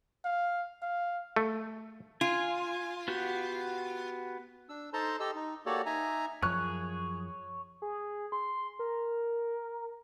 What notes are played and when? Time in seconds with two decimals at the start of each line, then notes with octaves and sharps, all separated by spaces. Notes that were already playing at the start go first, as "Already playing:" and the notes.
0.25 F5
0.82 F5
1.36 A3
2.21 F4 G#5
3.08 B3 F#4 G4
4.69 D4 E6
4.93 D#4 A4 C5 A5 A#5 C6
5.20 G4 A4 D#5 E6
5.36 D#4
5.66 A#3 F#4 G4 A4 C#5 D5
5.86 D#4 E5 G#5 A#5
6.42 F#2 F3 G#4 C#5 F#6
7.82 G#4
8.32 C6
8.79 A#4